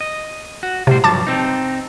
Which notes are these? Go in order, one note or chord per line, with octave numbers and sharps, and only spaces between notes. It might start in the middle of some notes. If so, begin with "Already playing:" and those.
D#5
F#4
A2 C3 G3 C5
G2 F3 F#3 A5 D6 A6
C4 D#4